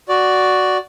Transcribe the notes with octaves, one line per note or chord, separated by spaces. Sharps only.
F#4 D5